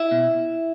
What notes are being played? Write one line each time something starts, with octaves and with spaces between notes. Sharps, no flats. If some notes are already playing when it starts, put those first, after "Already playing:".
Already playing: E4 E5
B2